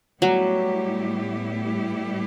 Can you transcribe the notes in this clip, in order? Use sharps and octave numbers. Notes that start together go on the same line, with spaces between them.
A2 F#3 G3 B3 E4 G4